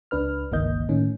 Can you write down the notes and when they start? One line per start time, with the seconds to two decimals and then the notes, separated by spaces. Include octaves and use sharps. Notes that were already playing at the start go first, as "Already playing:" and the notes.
0.11 C#2 D4 B4 F6
0.52 G1 C#2 D#3 A#3 D#5 G6
0.89 A2 D#3 C#4